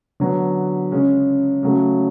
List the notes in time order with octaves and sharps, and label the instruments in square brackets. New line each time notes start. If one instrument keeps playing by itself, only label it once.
[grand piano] D3 F#3 B3
C#3 G#3 C#4
C#3 F#3 A3